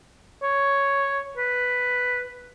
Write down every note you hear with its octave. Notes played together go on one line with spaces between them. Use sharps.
C#5
B4